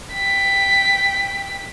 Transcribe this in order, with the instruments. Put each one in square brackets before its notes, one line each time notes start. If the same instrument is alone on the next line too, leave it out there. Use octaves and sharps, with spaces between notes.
[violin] G5 B6